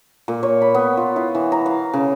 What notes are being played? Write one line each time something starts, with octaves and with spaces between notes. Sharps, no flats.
A#2
C#5
B5
B3
F4
E4
E3
A#5
F5
C#3